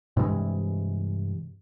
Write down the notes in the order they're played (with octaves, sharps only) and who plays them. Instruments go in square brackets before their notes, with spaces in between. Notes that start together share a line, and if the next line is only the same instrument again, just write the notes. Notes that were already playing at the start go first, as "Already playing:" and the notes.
[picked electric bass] G2 C3 E3 G#3